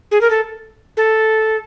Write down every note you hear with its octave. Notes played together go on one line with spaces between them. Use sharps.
G#4
A#4
A4
A4